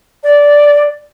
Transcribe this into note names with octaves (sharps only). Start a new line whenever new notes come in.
D5